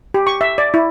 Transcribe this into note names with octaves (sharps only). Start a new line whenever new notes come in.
G4
C#6
E5
D5
E4